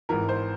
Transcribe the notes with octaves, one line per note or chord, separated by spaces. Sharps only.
G#1 G#2 E3 A#4
C5